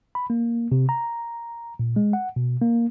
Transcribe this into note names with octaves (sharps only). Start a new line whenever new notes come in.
B5
A#3
C3
A#5
A#2
G#3
F#5
B2
A#3